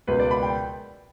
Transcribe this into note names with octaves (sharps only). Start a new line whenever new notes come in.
C#2 B2 A#3 B4
D5
B5
G5